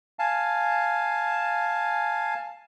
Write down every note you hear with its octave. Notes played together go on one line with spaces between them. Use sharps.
F5 G#5 A5